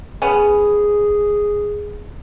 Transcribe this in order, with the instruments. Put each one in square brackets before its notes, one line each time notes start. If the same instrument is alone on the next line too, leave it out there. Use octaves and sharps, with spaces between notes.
[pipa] B3 C#4 [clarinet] G#4